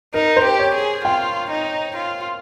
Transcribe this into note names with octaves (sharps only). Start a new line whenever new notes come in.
D#4 A#4
C5
G4
C#5
G#4
F4 G5
D#4
F4